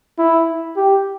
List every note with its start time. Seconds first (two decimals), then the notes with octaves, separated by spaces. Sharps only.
0.19 E4
0.77 G4